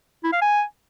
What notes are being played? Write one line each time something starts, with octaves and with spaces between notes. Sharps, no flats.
E4
F5
G#5